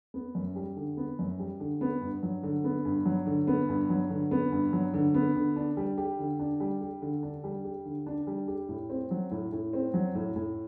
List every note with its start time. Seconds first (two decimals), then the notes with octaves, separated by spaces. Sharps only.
0.14 B3
0.35 F#2
0.56 G3
0.76 D3
0.97 B3
1.19 F#2
1.39 G3
1.60 D3
1.81 B3
2.01 G2
2.23 F#3
2.43 D3
2.64 B3
2.85 G2
3.06 F#3
3.27 D3
3.47 B3
3.69 G2
3.90 F#3
4.10 D3
4.31 B3
4.52 G2
4.73 F#3
4.94 D3
5.14 B3
5.35 D3
5.56 D4
5.77 G3
5.98 G4
6.19 D3
6.40 D4
6.60 G3
6.81 G4
7.02 D3
7.23 D4
7.44 G3
7.64 G4
7.85 D3
8.07 D4
8.27 G3
8.48 G4
8.69 A2
8.90 C4
9.11 F#3
9.31 A2
9.52 A2
9.73 C4
9.94 F#3
10.15 A2
10.36 A2